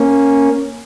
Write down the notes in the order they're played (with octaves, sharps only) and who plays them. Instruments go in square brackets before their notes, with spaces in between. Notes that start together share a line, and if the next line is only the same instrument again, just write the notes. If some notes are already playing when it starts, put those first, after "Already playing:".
Already playing: [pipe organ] A#3 C#4